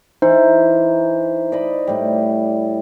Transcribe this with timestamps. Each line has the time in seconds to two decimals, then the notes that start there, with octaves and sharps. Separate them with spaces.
0.22 E3 D#4 C5
1.52 D5 D#5 B5
1.87 A2 G3